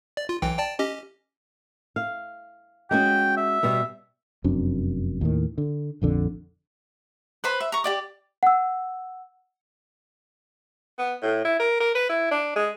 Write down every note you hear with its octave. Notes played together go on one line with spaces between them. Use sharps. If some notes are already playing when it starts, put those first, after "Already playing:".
D5
F4
B1 E3 G5
D5 G5 A5
C#4 G4 D#5
F5
G#3 C#4 F#4 G5
E5
B2 G3 B3
F1 F#2 C4 D4
D#2 A2 D#3
D3
A#1 F2 D3
B4 C5 B5
E5
A#5 C#6
G4 D5 D6
F#5 E6
B3
A2
E4
A#4
A#4
B4
E4
D4
G#3